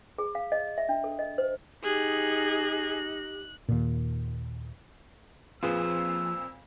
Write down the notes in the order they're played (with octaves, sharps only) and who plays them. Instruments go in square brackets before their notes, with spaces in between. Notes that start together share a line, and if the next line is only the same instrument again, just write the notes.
[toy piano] G#4
F5
D#5
E5
D4
A4
D#5
C5
[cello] D#4 [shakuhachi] G4 [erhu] G#4 [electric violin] F#6
[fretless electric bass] D#2 A#2
[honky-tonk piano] F2 A#2 C4 [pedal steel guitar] F3 [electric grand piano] F4 G#4 B4 [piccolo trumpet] E6